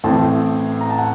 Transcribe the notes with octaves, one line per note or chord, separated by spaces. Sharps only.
A1 A2 A3 C4 A5
A#5
A5
F#5